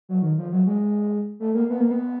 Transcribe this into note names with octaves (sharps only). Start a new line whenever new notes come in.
F#3
D#3
F3
F#3
G#3
A3
A#3
B3
A#3
B3